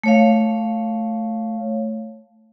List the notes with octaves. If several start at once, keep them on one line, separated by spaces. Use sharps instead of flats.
A3 C#5 F5